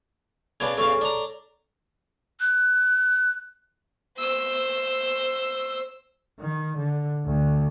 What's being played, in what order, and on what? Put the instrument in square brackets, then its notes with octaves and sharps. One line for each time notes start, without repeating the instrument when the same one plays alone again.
[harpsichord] C#3 B3 D4 [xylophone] G#6
[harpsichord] E2 C#3 F5 [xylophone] A4 C#5 C#6
[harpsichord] D4 A#5
[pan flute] F#6
[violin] C5 E6
[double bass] D#3
D3
D2 D3